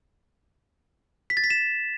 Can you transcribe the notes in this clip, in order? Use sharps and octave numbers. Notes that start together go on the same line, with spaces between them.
B6
A6
B6
E7